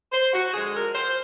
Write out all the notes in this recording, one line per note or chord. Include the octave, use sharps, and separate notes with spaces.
C5
F#4
D3 F3 G#3 G#4
A#4
C5